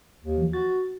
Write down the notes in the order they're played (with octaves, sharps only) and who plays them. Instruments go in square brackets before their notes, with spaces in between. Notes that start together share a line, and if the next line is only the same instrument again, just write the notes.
[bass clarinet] D#2
[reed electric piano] E3 F3
[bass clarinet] F#4 [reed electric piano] A6